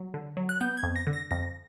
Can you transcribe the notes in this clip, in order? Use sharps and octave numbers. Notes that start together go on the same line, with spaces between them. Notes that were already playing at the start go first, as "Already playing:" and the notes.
Already playing: F#3
D3
F#3
F#6
B3 G6
G#6
F2
A#6
D3
A#6
F2 A#6